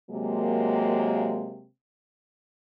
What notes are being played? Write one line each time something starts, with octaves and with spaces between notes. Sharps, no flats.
C3 F#3 G#3 A#3